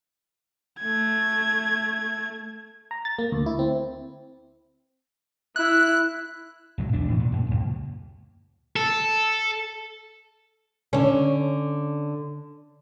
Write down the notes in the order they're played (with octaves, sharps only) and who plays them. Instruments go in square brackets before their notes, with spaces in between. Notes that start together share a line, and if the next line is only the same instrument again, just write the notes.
[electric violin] A3 G#6
[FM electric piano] A#5
A6
A#3
D2
E4
C4
[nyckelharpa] E4 [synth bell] F#6
[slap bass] B1 G#2 F#3
E1 E2 E3 D4
A2 E3
A#2
F#2
C#2 A#2
[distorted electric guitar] A4
[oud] D3 C#4